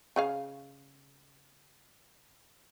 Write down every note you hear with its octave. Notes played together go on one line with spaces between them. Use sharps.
C#3 G#4 F5